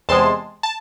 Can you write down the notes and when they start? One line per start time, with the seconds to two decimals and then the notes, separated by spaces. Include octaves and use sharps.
0.09 E2 C3 G#3 A5 C6
0.63 A5